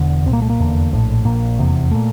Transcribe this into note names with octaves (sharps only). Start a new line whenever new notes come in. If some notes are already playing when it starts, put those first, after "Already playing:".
Already playing: E1 E2 D3
C2 A#2 A#3 C4
A3
A#3
F1 E2 D3
A#1 A2
A#1 A#2 A#3
F1 E2 C3
A#2 A3